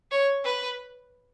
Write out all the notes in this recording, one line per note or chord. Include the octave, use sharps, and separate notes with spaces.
C#5
B4